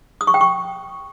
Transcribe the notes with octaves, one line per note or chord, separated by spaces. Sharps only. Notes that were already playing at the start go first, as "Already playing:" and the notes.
D#6
C#6
G5
C#6